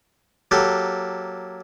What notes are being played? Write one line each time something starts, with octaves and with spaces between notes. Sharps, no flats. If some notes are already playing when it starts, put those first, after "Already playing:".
F#3 A#3 G4 A4